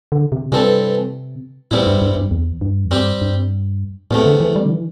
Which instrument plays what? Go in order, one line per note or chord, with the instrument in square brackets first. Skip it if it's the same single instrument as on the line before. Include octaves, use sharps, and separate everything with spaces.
[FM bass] D3
C3
[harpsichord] G2 E3 C4 A4 [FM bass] C3
[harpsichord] E2 C3 G3 C4 E4 [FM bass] A2
[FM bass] G2
G2
G2
E2
G2
E2
[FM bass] G2 [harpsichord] G3 C4 G4
[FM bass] G2
[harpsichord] E2 C3 A3 [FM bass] A2
[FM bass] D3
E3
G3
D3
E3